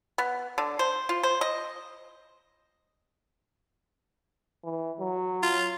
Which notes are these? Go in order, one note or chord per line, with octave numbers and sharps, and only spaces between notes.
B3
D3
C5
F4
C5
D#5
E3
F#3
F4